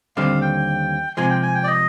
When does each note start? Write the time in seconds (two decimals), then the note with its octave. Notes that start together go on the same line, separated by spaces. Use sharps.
0.17 D#2 D3 G3 C4 F5
0.41 G5
1.17 C3 F3 G#3 G#5
1.30 G5
1.43 G#5
1.55 G5
1.64 D5
1.67 D#5